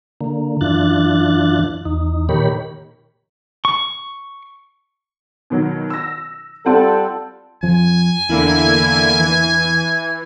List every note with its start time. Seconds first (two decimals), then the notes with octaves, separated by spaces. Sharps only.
0.21 D3 A#3
0.61 F#2 E3 D4 F4 F#6 A6
1.85 E2 D#4
2.29 A#2 D#3 G4 A#4 C#5 B5
3.65 C#6
5.50 B2 D#3 F#3
5.90 E6 A#6
6.66 G3 C4 F4 A4 F#5
7.63 F2 F3 G#5
8.29 E2 D3 A#3 E4
9.19 E3